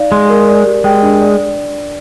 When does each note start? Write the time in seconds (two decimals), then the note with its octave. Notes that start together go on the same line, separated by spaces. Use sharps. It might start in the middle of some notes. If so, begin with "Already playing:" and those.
Already playing: D#4 D5 F5
0.11 G#3 C6
0.30 A#4
0.47 D5
0.66 G4
0.84 G#3 G5
1.02 D4
1.21 D5